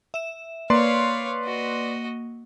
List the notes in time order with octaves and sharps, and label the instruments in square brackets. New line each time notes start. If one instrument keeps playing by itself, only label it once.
[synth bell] E5 E7
[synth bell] A#3 [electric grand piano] B4 D5 C6 [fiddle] C#5 F5
[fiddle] F#4 D#5